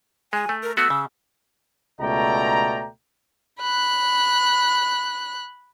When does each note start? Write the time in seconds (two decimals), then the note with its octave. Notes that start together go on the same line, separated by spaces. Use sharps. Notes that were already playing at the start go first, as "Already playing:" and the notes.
0.33 G#3 G#5
0.49 A3
0.63 A#4
0.77 A3 B3 F#4 E6
0.90 C#3
2.00 C#2 B2 A3 D5 G5 A#5
3.61 B5 F#6